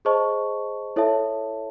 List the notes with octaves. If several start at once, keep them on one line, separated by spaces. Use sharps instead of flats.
G#4 C5 D#5 A5 C#6
E4 A4 C#5 E5 A5